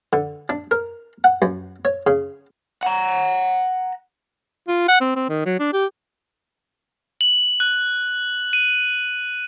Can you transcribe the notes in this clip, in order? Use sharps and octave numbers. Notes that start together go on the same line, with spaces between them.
D3
D4
A#4
F#5
F#2
C#5
C#3
F#5 A#5
F4
F#5
C4
C4
D#3
F#3
D4
G4
F#7
F#6
D#7